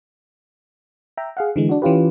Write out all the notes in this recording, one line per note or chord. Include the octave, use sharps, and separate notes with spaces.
E5 G5 A#5
G#4 F5 F#5
D3 E3 G#3
D4 F#4
E3 C#4 F4 G4 B4